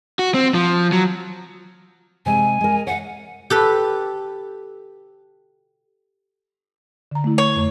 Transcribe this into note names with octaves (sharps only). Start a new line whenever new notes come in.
F#4
C4
F3
F#3
C3 G#3 G#5
G#3 A#4
C#5 F5 F#5
G4 A4 B4
D3 A#5
A3 E4
C#5
F2 A3